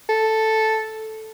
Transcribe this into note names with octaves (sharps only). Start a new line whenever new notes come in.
A4